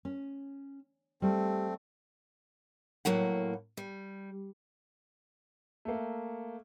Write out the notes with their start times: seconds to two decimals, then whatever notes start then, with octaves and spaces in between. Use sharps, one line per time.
0.05 C#4
1.22 G3 A3 C4
3.05 A2 F#3 A#3 F#5
3.77 G3
5.85 A3 A#3